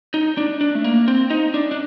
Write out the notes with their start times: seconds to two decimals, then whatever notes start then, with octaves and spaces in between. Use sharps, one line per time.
0.14 D#4
0.37 D4
0.61 D4
0.75 A3
0.84 A#3
1.08 C4
1.30 D#4
1.54 D4
1.71 D4